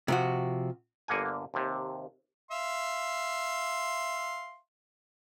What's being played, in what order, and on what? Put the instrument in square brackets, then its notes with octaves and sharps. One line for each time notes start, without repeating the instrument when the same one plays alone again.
[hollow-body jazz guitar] C3 F3 F#4
[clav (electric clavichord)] G1 D3 A#3 F#5 G#5
D#2 C3
[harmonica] E5 F5 C6